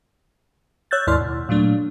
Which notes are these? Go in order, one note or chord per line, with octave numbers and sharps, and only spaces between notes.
C#5 E6 F#6 G6 A6
D#2 G#2 E4 D5 C6 F6
B2
A#2 F#3 A3 D4